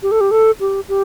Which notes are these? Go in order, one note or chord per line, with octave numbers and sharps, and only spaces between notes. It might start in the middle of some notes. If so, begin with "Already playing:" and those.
G4
A4
G4
A4
G4
G4